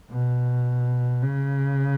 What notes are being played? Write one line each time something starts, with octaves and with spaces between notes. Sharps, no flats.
B2
C#3